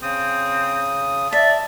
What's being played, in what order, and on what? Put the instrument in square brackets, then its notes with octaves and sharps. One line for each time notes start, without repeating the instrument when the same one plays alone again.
[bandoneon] C#3 D#6 [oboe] C4
[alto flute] D5 [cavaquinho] E5 [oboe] A5